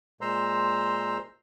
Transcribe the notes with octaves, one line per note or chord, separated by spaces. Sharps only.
A#2 G#3 C5 A#5 C6 E6